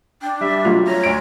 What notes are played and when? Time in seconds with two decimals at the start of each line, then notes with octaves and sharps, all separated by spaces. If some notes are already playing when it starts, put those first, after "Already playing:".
0.22 D4 G5
0.41 G3 E5
0.65 F#3 A3 F4
0.87 C#5 A#5
1.04 D2 D7